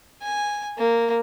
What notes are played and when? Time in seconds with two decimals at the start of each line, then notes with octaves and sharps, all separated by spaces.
0.23 G#5
0.78 A#3